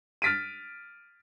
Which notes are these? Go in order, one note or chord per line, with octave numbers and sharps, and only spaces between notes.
F6 A6 B6 D7 D#7